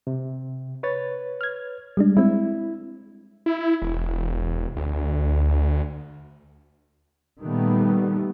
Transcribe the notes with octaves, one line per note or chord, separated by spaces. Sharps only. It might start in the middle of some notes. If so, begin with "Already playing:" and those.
C3
B4 C#5 A6
F6 G#6
G3 G#3 D4
G#3 C4 E4
E4
E1
D2
A#2 D#3 G3 A3 B3